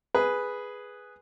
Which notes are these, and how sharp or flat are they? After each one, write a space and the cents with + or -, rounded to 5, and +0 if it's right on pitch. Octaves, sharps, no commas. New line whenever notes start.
G#4 +0 B4 +0